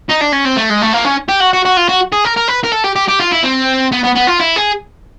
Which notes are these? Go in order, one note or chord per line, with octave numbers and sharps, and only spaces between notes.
D#4
D4
C#4
C4
A3
G#3
A3
A#3
C#4
G4
F#4
F#4
F#4
F4
F#4
G#4
A#4
A#4
B4
A#4
A4
G4
G4
G4
F4
E4
C4
B3
B3
B3
F4
E4
G#4